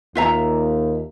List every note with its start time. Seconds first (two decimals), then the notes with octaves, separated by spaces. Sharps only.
0.15 D#2 F4 E5 A#5